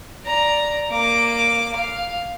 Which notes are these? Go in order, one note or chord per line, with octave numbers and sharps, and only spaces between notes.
D5 A#5
A#3 D6
F5